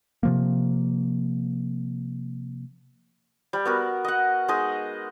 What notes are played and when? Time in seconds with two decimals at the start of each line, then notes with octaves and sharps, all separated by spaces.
0.23 C3 F3 A#3
3.53 G3
3.65 B3 F#4 A#4
4.04 D#5 F#5
4.48 G#3 D#4 D#5